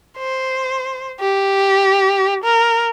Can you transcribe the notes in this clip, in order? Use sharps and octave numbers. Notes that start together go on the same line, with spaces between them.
C5
G4
A#4